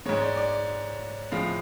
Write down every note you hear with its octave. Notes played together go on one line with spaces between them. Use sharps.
G#2 G#3 C#5
D5
D5
A2 F3 G#3 F5